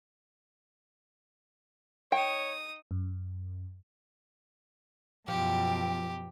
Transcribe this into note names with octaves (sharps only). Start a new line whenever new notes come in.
D#4 C#5 G5 D#6
F#2
F#2 B2 F3 G4 G5